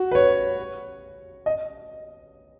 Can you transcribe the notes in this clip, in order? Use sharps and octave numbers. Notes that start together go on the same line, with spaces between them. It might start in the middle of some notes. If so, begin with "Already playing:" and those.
Already playing: F#4
B4
C#5
D#5